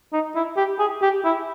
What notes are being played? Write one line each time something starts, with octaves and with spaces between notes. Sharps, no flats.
D#4
E4
G4
G#4
G4
E4